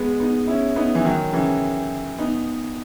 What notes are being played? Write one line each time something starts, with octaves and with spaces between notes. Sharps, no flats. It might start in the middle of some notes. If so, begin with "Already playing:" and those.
Already playing: G#3 B3
B3 D#4
C#4 E4
B3 D#4
E3
D#3 F#3
C#3 E3
B3 D#4